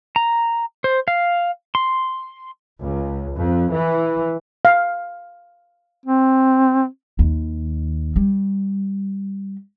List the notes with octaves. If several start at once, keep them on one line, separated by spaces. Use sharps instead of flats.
A#5
C5
F5
C6
C#2
F2
E3
F5
C4
D#2
G3